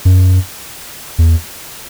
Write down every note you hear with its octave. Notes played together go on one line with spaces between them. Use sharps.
F#2
E2